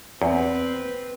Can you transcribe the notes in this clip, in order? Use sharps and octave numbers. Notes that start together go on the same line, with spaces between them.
E2 C4 B4